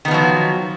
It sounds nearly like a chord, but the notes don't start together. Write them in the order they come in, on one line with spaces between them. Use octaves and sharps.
D#3 B3 F3 F#3